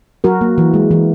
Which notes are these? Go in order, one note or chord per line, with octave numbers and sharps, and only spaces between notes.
F#3 F#4 A#4
A#3
E3
G#3
E3